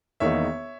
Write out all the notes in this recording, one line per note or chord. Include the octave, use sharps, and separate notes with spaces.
E1 E2 D#3 A#3 D#4 C#5 E5